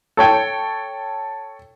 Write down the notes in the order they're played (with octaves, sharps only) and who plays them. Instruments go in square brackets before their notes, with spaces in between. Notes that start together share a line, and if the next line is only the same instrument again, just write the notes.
[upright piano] A4 C#5 G5